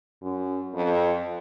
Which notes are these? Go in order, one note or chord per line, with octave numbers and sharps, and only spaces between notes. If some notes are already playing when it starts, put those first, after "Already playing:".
F#2
F2